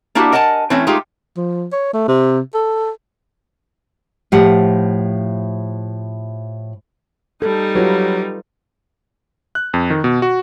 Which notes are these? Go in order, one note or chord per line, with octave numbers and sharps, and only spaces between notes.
A#3 D4 E4 F#4 G4
A#4 D#5 F#5 G#5 A5
E3 A3 C4 C#4 E4
G#3 A3 D#4 F4 G4
F3
C#5
A3
C3
A4
A2 F3 G4 F#5
G3 D#4 A4
F#3 F4 G4 B4
F#6
F2
D#3
B2
F#4